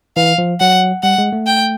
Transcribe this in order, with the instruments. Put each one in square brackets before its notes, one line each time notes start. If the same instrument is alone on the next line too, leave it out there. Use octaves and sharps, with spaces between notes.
[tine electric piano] E3 [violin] F5
[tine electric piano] F3
[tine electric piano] F#3 [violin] F#5
[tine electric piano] G3 [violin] F#5
[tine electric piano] G#3
A3
[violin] G5